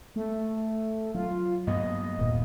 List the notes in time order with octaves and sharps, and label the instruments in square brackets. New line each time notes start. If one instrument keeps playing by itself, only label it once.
[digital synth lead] A3
[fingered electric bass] F#3 [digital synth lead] F4
[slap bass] G2 A#3 B3 [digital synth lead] D#5
[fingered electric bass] D#1 A#2 D#3